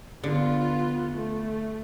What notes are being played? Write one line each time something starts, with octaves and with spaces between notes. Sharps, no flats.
D3 B3 F4
A3